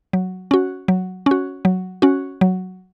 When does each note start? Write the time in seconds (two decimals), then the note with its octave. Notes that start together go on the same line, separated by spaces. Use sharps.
0.13 F#3
0.51 C#4 F#4
0.88 F#3
1.26 C#4 F#4
1.65 F#3
2.02 C#4 F#4
2.41 F#3